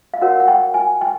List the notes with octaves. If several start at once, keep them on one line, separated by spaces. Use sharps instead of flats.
F5
F#4 A#4 C#5 F#5
F#5
G5
G#5
G5